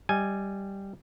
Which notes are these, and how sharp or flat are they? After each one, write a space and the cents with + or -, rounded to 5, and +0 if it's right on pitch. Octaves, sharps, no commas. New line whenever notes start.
G3 +0 D#5 +20 G#5 +0